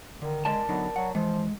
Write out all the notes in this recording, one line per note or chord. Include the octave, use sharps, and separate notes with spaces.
D3 D#3
G#3 A#4 D5 A5
D3 F#3 B3 D#4
F#3 F#5
E3 F3 G#3